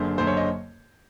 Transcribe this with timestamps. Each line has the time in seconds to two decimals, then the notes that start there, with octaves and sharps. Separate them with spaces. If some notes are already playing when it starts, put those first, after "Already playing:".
Already playing: F#1 F#2 D3 C5
0.18 F#1 F#2 D3 C5
0.27 C#5
0.37 D#5